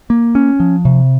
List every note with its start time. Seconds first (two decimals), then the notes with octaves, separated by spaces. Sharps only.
0.10 A#3
0.35 C#4
0.60 F3
0.85 C3